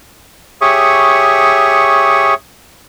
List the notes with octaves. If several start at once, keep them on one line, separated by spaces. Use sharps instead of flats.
G4 G#4 C#5 E5 C#6 D#6